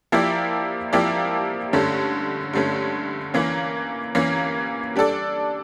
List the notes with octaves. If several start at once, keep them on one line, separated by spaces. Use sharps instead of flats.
F3 A#3 E4 G4 D5
F3 A#3 E4 G4 D5
G2 D3 A3 C#4
G2 D3 A3 C#4
E3 A#3 C#4
E3 A#3 C#4
G3 D4 A4 D5